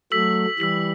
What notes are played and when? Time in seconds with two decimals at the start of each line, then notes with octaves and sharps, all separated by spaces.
0.12 F#3 A3 E6 B6 F#7
0.59 E3 G3 E6 B6 F#7